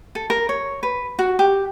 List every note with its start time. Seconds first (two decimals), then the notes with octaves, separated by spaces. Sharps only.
0.15 A4
0.30 A#4
0.49 C#5
0.83 B4
1.19 F#4
1.39 G4